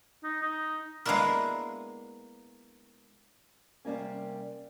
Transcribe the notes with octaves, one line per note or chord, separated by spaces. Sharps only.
D#4
D#4
G#3 A#3 B3 D4 E4 A#4
C3 G3 A#3 C#4